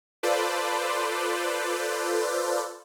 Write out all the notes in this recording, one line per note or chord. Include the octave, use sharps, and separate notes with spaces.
F4 A4 B4 C5 D5